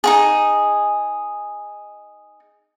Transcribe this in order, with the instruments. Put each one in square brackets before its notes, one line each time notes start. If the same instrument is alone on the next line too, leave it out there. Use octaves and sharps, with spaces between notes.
[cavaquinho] D#4 F4 G#4